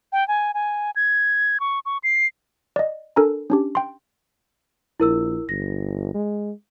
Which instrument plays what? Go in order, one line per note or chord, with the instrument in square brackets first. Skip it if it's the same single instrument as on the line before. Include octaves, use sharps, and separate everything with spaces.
[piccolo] G5
G#5
G#5
G#6
C#6
C#6
C7
[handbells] D5 D#5
D4 A4 A#4 G#5 A#5
C#4 D4 G4
G5 C6
[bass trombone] A#1 [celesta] E4 A#4 E6
[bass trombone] G1 [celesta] A#6
[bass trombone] G#3